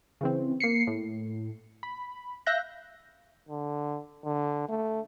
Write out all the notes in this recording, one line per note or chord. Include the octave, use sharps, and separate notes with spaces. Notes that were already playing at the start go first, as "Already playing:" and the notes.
C#3 E3 C4
A#3 C7 C#7
A2
B5
E5 F5 F#6 G6 A#6
D3
D3
A3